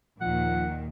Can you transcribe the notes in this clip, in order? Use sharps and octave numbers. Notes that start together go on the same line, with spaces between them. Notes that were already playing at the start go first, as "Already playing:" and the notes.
D#2 A#2 D#3 F3 F#5